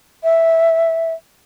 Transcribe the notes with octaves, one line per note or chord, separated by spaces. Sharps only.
E5